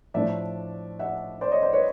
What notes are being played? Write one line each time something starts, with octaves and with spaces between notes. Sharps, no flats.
A2 F3 A3 D4 D5 E5
E5 F#5
C5 D5
C#5 D#5
C5 D5
B4 C#5